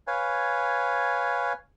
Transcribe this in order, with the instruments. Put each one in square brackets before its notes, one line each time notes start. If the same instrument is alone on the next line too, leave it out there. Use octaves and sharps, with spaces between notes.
[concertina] B4 C#5 F5 G#5